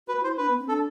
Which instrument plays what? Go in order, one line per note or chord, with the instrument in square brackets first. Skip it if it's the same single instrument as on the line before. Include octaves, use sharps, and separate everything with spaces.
[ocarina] F#4 [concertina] B4
[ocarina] E4 [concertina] C5
[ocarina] D4 [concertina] B4
[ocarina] B3
C4
[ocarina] D4 [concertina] A4